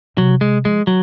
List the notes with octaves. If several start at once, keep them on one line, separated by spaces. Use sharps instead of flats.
C3 F#3
C3 G#3
F3 G#3
D#3 F#3